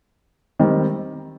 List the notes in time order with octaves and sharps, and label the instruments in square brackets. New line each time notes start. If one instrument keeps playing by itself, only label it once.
[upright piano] D#3 G3 C4